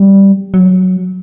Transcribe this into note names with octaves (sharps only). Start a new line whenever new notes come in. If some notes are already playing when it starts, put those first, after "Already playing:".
Already playing: G3
F#3